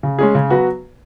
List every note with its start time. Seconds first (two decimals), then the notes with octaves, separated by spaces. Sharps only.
0.03 C#3
0.19 G#3 C#4 G#4
0.35 C#3
0.50 F#3 B3 F#4 B4